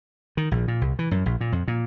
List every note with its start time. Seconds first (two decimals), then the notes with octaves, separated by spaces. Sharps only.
0.37 D#3
0.51 A#1
0.68 A#2
0.81 C2
0.99 E3
1.11 F#2
1.26 A#1
1.41 A#2
1.52 F2
1.68 A#2